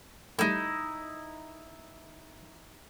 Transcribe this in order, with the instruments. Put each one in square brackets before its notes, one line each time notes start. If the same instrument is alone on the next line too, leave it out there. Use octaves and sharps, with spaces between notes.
[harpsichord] A2 G3 [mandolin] D#4 E4